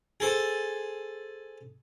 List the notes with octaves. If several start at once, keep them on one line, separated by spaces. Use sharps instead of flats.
G#4 A4 C5